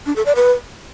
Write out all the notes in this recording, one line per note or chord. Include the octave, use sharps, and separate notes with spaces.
D4
A4
D5
B4